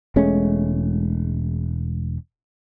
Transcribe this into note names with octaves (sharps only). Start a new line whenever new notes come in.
E1 G#3 A3 C#4